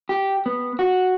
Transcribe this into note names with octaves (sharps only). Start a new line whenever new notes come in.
G4
B3
F#4